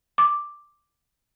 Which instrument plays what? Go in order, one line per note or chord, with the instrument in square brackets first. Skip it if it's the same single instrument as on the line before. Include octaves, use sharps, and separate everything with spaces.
[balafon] D6